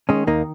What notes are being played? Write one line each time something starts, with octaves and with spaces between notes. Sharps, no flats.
D#3 G#3 C#4
D#2 A#3 D#4